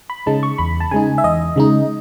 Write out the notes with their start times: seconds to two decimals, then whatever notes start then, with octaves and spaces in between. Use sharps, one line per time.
0.10 B5
0.26 C#3 G#3 D#4 A5
0.43 C#6
0.58 E2 B5
0.80 A5
0.91 C#3 G#3 D#4 G#5
1.18 E5
1.24 E2 D#5
1.56 C#3 G#3 D#4